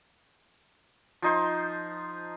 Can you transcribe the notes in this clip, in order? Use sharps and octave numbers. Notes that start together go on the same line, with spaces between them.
F3 D#4 C5